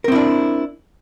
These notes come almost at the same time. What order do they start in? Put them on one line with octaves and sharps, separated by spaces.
A#4 C4 E4 D4